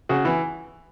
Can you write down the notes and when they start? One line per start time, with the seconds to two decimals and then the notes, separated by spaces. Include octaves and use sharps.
0.09 C#3 F#4
0.25 E3